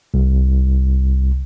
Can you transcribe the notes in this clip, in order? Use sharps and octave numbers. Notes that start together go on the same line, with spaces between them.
C2